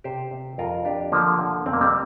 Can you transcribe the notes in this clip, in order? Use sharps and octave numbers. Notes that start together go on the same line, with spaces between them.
C3 G4 C5
C3
F2 F4 A#4
F2 D4 G4
D3 F3 A#3
D3
F2 C4
A#3
G3 C4